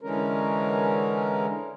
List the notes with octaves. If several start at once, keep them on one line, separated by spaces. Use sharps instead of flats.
D3 E3 G#3 C#4 A#4